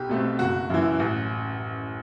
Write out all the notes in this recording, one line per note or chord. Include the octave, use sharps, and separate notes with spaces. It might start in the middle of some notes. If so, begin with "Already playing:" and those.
Already playing: B1 G4
B2 A3 C4
F#1 F#4
F#2 E3
A1